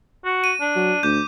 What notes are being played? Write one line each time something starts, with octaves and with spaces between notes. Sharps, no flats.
F#4
D#7
D4
F#3
D2 D6 G6